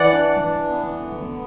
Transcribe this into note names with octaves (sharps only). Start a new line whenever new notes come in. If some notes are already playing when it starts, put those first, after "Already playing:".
Already playing: E3 D5 F#5
D4
E3
B3
D3
B3